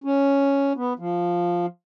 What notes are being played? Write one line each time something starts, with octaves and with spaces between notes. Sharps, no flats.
C#4
B3
F3